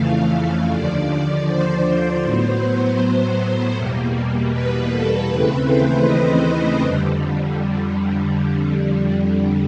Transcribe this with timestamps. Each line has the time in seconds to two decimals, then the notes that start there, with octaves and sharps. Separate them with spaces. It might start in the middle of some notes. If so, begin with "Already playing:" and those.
Already playing: F2 C#3 E3 A3 F5
0.71 D#2 D3 F3 D5
1.47 C5
2.24 A2 F#3 B3
3.76 E2 B2 G3 A#3
4.52 B4
4.90 A4
5.28 D#2 C#3 E3 A3 C4 B4
5.66 C5
6.04 D#5
6.81 F2 D3 G3